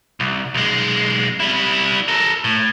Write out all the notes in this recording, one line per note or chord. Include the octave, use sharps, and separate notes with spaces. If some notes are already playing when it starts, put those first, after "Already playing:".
C2
B1 G#3
G3 E4
A4 A#4
A2